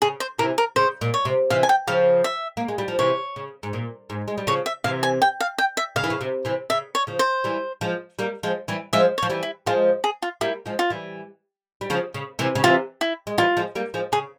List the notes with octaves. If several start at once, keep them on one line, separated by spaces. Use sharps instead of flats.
C#3 G#4
C5
C3 E3 A#4
A#4
C#3 C5
A#2
C#5
C3
C3 E3 F5
G#5
G5
C#3 F3 F5
E5
A#3
G#3
G3
F3
C3 E3 C#5
C#3
G#2
A#2
G#2
G#3
G3
C#3 F3 C#5
E5
C3 E3 F5
G#5
G5
F5
G5
E5
C#3 F5
E3
C#3
C3
C3 E3
C#3 E5
C#5
C#3 F3
C5
E3 G3
F3 G#3
G3 A#3
F3 G#3
E3 G3
F3 G#3 E5
C#5
F3
E3 G3
E4
F3 G#3 F4
G#4
F4
G3 A#3 E4
F3 G#3
F4
E3 G3
G3
C#3 F3
C#3
C3 E3
C#3
C3 E3 F4
E4
G#3
E3 G3 F4
F3 G#3
G3 A#3
F3 G#3
C#3 G#4